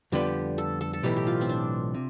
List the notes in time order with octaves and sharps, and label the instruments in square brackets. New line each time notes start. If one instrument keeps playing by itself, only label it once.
[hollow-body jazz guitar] F2 D3 G3 B3 F4 [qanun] G4
[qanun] A4
A4
A4
[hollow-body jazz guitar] B1 A2 E3 [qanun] G4
[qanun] G4
F4
C4
D4
[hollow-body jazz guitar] C3